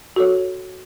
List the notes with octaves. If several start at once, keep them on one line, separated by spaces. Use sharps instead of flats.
F#4 A4 C#5